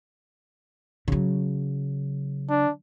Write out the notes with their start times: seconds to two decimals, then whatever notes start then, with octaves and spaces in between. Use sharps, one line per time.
1.08 C#3 F#3
2.50 D4